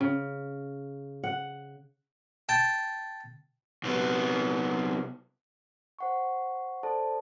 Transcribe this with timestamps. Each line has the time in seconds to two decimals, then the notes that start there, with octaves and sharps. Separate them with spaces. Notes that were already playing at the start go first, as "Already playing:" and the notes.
0.01 C#3
1.24 F#5
2.49 G5 A5
3.83 C2 B3
5.99 C5 F#5 C#6
6.83 A4 C5 D5 A5